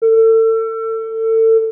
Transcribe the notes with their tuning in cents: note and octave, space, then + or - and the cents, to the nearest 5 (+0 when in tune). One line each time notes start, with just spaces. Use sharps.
A4 +30